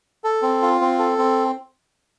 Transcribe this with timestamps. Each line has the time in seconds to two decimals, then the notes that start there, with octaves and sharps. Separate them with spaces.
0.24 A4
0.42 C4
0.62 F4
0.81 C4
0.99 A4
1.18 C4